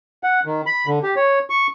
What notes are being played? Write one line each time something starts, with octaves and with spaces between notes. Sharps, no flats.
F#5
D#3
B5
D3
G4
C#5
C#6